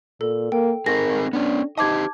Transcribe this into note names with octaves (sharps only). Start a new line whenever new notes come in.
A#2 A4
A#3 G5
C4 D#4 G#4 A#4 A#6
B3 C#4 D4
D#4 G4 C5 D#5 A5 D6 G#6